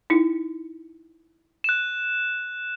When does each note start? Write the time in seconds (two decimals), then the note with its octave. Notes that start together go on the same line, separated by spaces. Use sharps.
0.10 D#4 E4
1.64 F#6 E7